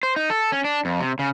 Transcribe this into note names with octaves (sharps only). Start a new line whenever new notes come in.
C5
D#4
A4
C#4
D4
F2
C3
C#3